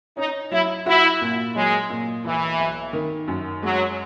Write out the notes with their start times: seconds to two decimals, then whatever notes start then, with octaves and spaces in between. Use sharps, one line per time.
0.17 C#4 D#4
0.51 F#3 E4
0.86 E4 F#4
1.21 A#2
1.55 F#3 G#3
1.90 A#2
2.25 B1 E3
2.59 B1
2.93 D#3
3.28 F#2
3.63 F#3 G#3